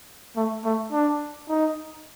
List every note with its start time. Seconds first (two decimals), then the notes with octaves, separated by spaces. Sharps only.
0.36 A3
0.65 A3
0.93 D4
1.49 D#4